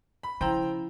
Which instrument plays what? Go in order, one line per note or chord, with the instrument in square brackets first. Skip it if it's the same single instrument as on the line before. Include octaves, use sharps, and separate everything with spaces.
[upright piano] B5
[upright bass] C#3 [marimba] F3 E4 [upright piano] C5 G5 A#5